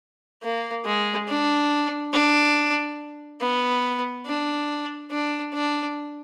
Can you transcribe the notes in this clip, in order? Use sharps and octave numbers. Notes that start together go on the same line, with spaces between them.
A#3
G#3
D4
D4
B3
D4
D4
D4